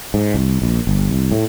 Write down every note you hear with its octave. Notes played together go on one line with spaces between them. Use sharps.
G#2
C2
A#1
G1
C2
A2